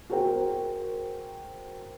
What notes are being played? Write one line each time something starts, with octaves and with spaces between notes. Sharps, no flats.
F#4 G#4 A#4 C5 G5